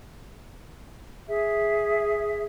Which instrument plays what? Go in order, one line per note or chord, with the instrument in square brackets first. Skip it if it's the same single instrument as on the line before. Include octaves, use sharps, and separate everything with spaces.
[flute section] G#4 E5